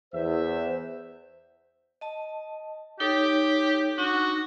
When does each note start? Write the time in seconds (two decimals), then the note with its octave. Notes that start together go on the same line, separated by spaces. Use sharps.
0.13 E2 C5 E5
2.01 D#5 A5
3.00 D#4 G4 A4 C#5
3.98 D4 D#4 F#4